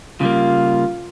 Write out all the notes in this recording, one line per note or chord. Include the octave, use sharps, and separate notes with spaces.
C#3 G3 A#3 F4